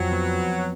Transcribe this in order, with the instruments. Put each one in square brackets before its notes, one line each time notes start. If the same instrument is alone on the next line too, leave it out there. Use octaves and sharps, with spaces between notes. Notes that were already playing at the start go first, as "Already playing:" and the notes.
Already playing: [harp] F2 [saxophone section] F#3
[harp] B3